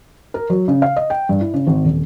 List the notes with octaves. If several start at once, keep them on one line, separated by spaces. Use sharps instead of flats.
A#4
F#3
C#3
F5
D#5
G5
G2
E4
C#3
G#1
D#1